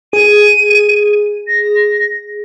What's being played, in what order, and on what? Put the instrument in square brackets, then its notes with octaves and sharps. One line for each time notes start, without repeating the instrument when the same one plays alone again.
[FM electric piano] G#4 [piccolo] D#7
[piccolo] A#6